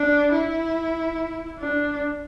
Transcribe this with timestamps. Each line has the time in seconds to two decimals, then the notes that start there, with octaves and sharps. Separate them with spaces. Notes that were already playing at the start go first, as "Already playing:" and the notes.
Already playing: D4
0.32 E4
1.59 D4